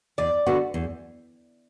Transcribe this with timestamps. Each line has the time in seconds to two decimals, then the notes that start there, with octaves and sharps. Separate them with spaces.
0.18 E2 D5
0.46 D3 B3 F#4
0.74 E2